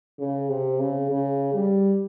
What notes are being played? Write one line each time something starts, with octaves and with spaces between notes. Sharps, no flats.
C#3
C3
C#3
C#3
G3